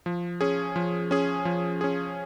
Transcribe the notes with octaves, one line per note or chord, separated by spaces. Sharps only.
F3
C#4 G#4
F3
C#4 G#4
F3
C#4 G#4